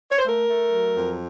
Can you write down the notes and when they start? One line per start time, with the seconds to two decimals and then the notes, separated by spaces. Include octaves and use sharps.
0.11 C#5
0.19 C5
0.25 A3 A#4
0.49 A3
0.72 F#3
0.95 F2